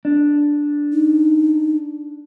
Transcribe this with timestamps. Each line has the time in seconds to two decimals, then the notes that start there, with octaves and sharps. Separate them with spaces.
0.05 D4
0.93 D#4